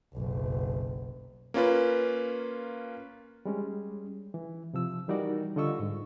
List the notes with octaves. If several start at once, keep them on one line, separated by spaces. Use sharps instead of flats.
F#1 B1
A#3 C#4 F4 B4
G3 G#3 C#4
E3
C3 F3 E6
E3 G3 D#4 F#4 A#4 D5
D3 G3 F4 D#5 C#6 E6
G#2